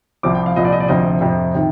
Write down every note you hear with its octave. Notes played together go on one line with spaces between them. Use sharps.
C2 C3 F3 D6
G5
F5
C2 A#2 F3 D#5
D5
D#5
D5
D2 C3 F3 D#5
F2 C3 F3
C3 D#3